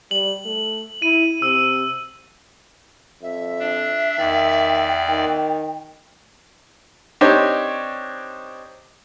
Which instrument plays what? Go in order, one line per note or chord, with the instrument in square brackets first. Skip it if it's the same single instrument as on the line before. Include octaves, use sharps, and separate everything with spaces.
[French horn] G3 [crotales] F#7
[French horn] A3
[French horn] E4 [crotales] D#7
[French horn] C3 [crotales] E6
[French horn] F2 [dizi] E5
[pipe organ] D4
[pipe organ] E2 D5 [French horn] D#3 [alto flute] G5
[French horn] D#3
[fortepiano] C4 D4 D#4 G4 C5 C#5